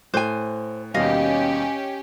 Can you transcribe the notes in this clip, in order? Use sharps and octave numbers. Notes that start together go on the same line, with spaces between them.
A2 A4 C5 G#5 F#6
D#2 B2 G3 C#4 G4 D#5 F5